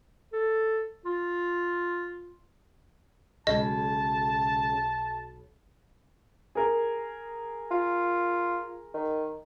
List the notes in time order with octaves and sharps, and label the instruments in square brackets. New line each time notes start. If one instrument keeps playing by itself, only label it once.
[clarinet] A4
F4
[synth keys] B1 [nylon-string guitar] C#3 G#3 [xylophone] D#5 [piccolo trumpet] A5
[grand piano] G#4 A#4
[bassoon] F4
D#3